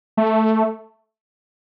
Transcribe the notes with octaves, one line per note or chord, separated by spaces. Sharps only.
A3